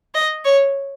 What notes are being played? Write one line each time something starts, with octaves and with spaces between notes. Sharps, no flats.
D#5
C#5